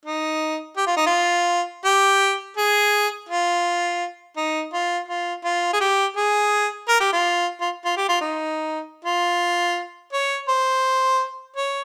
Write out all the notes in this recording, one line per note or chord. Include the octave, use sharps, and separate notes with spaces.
D#4
G4
F4
D#4
F4
G4
G#4
F4
D#4
F4
F4
F4
G#4
G4
G#4
A#4
G4
F4
F4
F4
G4
F4
D#4
F4
C#5
C5
C#5